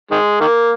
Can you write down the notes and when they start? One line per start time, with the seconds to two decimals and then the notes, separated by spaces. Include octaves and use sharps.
0.11 D#3 G#3
0.40 D#3 A#3